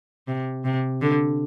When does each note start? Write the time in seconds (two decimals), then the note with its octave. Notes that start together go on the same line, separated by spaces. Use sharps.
0.28 C3
0.65 C3
1.02 D3